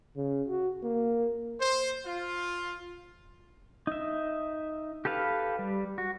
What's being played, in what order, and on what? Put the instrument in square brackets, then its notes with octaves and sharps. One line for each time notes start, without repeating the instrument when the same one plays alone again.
[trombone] C#3
F#4
A#3
[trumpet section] C5
F4
[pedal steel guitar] D#4 E5
G4 A4 B4 F5
G3
F#4